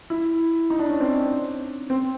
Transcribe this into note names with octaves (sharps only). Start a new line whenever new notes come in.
E4
D#4
D4
C#4
C4
C4